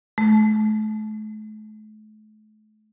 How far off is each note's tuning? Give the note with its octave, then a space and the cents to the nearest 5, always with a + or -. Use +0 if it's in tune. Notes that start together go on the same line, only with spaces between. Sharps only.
A3 -40